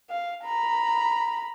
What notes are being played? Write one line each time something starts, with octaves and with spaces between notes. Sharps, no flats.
F5
A#5 B5